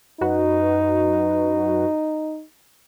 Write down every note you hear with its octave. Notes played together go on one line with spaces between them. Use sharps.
F#2 D#4 F#4 B4